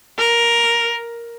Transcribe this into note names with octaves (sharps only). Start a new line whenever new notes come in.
A#4